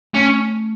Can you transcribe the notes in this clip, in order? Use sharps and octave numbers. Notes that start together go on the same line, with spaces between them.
A3 C#4